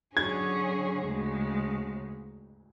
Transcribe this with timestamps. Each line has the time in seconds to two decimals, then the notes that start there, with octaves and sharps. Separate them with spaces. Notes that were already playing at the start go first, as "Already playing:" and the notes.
0.16 D3 F#3 C#4 G#4 G#6
1.07 D2 C#3 G#3